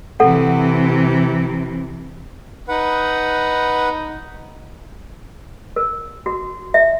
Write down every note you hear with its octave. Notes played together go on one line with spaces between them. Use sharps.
C3 E3 A4 F#5
D#4 B4 F#5
A#4
F#4
E5